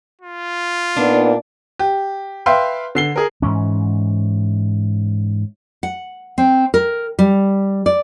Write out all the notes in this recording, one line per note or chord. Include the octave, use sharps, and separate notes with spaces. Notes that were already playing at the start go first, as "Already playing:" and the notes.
F4
A#2 B3 D4 D#4
G4
B4 E5 F5 G5 C6
D3 C7 G7
G#4 A#4
G#2 E3 C#4
F#5
C4
A#4
G3
D5